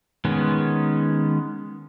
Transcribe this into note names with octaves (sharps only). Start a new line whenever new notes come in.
D#3 G#3 B3 C#4